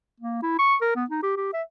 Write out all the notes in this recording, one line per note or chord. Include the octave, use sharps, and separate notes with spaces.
A#3
E4
C#6
A#4
B3
D#4
G4
G4
E5